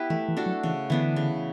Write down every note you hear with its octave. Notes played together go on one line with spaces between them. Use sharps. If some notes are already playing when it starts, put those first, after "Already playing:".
Already playing: B3 E4 G4 B4
E3 A3
E3
D4 F#4 A4
F#3
C#3 E3
D3 E3 B3 D4
C#3